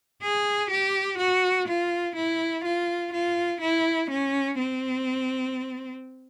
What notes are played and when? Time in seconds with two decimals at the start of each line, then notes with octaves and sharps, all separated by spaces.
0.22 G#4
0.70 G4
1.18 F#4
1.68 F4
2.16 E4
2.64 F4
3.13 F4
3.61 E4
4.10 C#4
4.59 C4